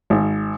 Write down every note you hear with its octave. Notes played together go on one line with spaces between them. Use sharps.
G#1